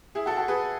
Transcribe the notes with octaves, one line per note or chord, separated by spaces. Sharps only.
E4 G#4
F#4 A4
F#4 A4
G#4 B4